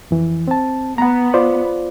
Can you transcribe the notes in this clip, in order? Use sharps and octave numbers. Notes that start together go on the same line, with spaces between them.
F2 E3
C4 A5
B3 F#5 A#5
F4 C5 D5